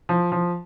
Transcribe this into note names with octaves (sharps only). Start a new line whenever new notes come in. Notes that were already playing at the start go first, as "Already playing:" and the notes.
F3
F3